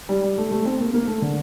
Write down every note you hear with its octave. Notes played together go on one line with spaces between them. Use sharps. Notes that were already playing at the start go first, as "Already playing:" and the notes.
G3
G3
A3
A3
C4
A#3
A#3
A3
D3